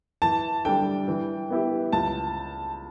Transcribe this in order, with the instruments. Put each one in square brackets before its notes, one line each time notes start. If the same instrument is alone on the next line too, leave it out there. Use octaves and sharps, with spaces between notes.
[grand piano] E3 [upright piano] A5
[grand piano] G3 D4 A4 [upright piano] G5
[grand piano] E3
B3 E4 G4
[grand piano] C#2 [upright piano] A5